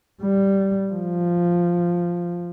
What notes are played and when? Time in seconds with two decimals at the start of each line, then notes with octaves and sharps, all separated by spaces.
0.22 G3
0.92 F3